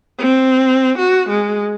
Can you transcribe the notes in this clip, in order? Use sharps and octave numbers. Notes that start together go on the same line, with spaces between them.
C4
F#4
G#3